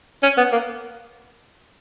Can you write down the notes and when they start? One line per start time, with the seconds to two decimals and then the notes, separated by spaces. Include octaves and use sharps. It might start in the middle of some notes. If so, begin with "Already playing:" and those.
0.23 C#4
0.37 B3
0.52 A#3